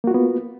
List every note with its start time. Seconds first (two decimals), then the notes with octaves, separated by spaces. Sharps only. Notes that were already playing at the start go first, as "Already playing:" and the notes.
0.04 A#3
0.07 F#4
0.11 F4
0.14 B3